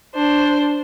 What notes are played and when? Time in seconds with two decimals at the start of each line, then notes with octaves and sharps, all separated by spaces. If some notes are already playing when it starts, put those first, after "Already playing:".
0.15 D4 C5